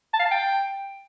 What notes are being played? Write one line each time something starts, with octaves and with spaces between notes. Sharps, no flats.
A5
F5
A5
G5